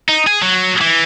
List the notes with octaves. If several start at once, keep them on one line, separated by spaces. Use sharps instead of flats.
D#4
G#4
F#3
E3